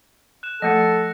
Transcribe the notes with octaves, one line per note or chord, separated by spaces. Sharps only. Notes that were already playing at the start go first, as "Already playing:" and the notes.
F#6 E7
F3 A3 A4 A#6 C#7